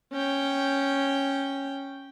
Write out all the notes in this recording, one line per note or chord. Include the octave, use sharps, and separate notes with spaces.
C#4 G5